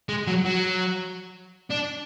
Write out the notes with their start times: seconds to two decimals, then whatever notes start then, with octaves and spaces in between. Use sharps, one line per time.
0.09 G#3
0.27 F#3
0.45 F#3
1.71 D4